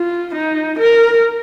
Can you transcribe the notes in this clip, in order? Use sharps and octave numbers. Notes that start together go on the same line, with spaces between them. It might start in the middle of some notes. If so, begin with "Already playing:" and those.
Already playing: F4
D#4
A#4